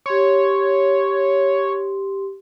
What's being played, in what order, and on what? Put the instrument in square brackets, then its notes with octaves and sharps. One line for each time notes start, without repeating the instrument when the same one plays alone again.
[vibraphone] G4 C6 [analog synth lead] C#5